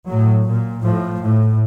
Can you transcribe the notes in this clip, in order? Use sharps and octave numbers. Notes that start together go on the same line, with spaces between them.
A2 F#3
A#2
A2 F3
A2